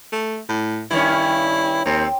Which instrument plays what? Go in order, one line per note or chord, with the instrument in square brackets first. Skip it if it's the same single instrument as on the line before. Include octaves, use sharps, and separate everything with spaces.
[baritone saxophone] A3
A2
[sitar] G2 D#3 C#4 [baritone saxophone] E4
[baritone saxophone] D#2 [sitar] C4